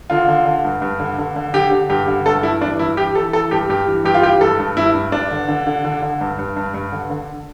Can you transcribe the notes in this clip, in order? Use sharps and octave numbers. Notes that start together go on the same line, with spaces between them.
D3 F4
D3
D3
G2
G2
D3
D3
D3
D3 G4
D3
G2 G4
D3
G2 A4
G2 E4
E3 D4
G2 E4
E3 G4
E3 A4
E3 A4
G2 G4
G2 G4
E3
G2 G4
F4
E3 G4
G2 A4
G2
G2 E4
G2
G2 D4
D3
D3
D3
D3
D3
G2
G2
G2
G2
D3
D3